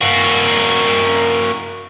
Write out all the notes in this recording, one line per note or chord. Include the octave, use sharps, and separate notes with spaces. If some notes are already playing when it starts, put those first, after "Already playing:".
A#3 F#4